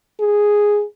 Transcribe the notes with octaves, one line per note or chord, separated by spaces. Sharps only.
G#4